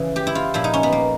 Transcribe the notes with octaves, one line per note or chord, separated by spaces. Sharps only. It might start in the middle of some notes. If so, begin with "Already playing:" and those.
Already playing: C#3 E3
G4
E4
F4
A#2 F3 E4
D#4
C#4
B3
A#3